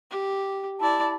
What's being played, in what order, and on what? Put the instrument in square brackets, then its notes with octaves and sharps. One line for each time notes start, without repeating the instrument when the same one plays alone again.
[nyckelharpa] G4
[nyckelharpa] E4 D5 [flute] A5